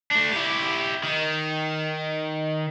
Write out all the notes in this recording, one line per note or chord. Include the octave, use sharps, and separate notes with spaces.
A3 D4
E4 G4
D#3